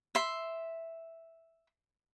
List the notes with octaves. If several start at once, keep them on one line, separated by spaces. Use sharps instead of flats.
E5 C6